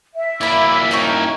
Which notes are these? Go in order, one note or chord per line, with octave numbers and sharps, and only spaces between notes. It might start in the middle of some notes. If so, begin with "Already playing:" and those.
E5
A#3 E4 D5 B5
C#4 D#4 G5